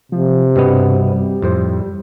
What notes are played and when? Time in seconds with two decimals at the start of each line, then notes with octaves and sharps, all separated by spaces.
0.12 C3 F3
0.56 G2 B2 G3 B3
1.42 F2 A2 C5